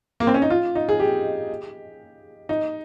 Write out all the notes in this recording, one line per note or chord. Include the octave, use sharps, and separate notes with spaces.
A#3
C4
C#4
D#4
F4
D#4
G#4
G4
D#4